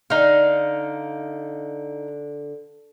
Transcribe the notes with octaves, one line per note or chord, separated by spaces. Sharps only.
D3 D#4 F5